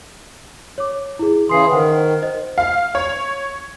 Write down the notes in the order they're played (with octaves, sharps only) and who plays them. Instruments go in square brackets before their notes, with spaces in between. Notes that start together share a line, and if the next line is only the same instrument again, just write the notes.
[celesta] C#5 D6
E4 G#4
[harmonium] C#3 E3 G#4 [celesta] C6 C7
[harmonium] D#3 [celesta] C5 F#5 G5
[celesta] C5 D#5
[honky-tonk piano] F5
C#5